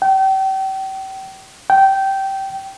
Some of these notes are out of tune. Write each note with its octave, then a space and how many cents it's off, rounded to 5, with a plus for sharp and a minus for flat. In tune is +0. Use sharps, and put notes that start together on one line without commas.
G5 -35
G5 -15